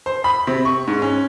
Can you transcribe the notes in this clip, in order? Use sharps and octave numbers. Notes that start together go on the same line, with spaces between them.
C5
B5
C3
C#6
G#2
C#4